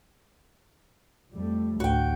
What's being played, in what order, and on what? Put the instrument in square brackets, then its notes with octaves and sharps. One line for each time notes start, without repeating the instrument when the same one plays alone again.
[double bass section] F2 G3 A3
[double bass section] A1 D2 [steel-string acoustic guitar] F#4 G5